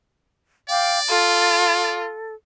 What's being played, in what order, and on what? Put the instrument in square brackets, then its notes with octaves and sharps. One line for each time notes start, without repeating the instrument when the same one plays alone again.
[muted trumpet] D5 [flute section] F5 G5 D6
[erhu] F4 [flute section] A4